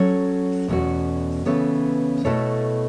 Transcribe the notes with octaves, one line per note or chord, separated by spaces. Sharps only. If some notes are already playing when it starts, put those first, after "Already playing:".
Already playing: F#3 C#4 A4 C#5
E2 B2 A3 C#4 F#4
C#3 E3 B3 A4 C#5
B2 A3 E4 A4 C#5